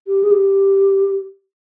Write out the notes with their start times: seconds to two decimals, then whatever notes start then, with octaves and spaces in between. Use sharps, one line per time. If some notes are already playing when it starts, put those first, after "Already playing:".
0.07 G4
0.23 G#4
0.31 G4